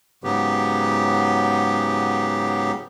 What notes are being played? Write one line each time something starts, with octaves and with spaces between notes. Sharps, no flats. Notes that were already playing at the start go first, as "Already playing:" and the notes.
G#2 C#3 F#3 B3 G4